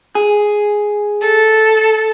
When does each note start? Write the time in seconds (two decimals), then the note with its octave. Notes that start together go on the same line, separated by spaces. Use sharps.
0.15 G#4
1.22 A4